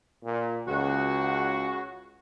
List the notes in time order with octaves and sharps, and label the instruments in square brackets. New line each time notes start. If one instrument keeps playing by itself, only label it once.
[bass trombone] A#2
[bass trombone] C#2 [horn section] C#3 F#4